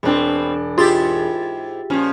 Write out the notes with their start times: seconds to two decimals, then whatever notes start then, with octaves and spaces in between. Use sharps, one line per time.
0.03 E1 B2 C4 D4
0.78 G#2 E4 F4 G4 G#4 A6
1.90 A#2 F3 C#4